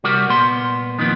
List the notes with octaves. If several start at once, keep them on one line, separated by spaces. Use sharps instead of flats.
C2 G3 F#4 G4 A#4
A#2 B3 C6
F2 A#2 D#3 B3